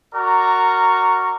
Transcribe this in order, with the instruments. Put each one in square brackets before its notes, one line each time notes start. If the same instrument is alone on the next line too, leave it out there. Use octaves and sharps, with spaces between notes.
[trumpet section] F#4 A#4 D5 A#5 C#6